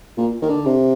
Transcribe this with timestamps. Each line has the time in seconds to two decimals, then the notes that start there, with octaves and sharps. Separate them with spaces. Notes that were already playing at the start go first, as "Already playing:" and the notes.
0.17 A#2
0.42 D#3
0.50 D3
0.66 C3